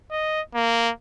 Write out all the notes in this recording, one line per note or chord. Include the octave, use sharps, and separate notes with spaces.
D#5
A#3